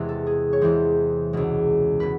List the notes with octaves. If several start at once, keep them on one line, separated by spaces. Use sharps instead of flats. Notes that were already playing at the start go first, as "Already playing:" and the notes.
Already playing: E2 C3 E3 G#3
A4
G#4
C#5
E2 C3 E3 G#3 C5
C#2 B2 G#3
B2 B4